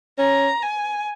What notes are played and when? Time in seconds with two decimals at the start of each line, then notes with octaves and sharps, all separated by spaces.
0.18 C#4 A#5
0.62 G#5